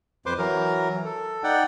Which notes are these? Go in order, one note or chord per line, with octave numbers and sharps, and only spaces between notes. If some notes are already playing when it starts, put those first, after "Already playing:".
F2 B4 C5 C6 D6
E3 F#3 A#4
A4
D#4 D5 F#5 G5